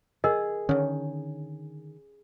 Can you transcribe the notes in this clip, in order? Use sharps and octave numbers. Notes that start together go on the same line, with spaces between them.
G#4 A#4 D#5
D3 D#3 C#4